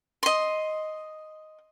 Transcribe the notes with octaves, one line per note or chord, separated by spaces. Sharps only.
D#5 C6